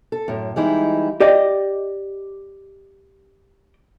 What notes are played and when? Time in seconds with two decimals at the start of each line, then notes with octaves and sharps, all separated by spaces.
0.12 A4
0.28 F#2 A2
0.56 E3 G3 G#3 D#4 E4
1.21 G4 D5 D#5